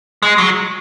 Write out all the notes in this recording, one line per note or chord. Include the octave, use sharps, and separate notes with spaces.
G#3
F#3